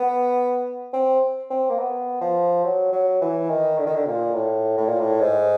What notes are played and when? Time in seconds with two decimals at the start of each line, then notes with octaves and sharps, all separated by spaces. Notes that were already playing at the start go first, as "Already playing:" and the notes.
Already playing: B3
0.94 C4
1.51 C4
1.70 A#3
1.79 B3
2.21 F3
2.64 F#3
2.93 F#3
3.22 E3
3.50 D#3
3.78 D3
3.87 D#3
3.96 D3
4.07 A#2
4.35 A2
4.78 A2
4.89 A#2
5.00 A2
5.20 G#2